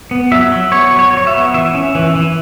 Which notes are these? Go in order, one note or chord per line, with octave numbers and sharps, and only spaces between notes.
B3
F#3 E5
F#3
B3 C#5
F#3
C#5
F#3 C#5
E5
B3
E3 E5
C#4
E3
E3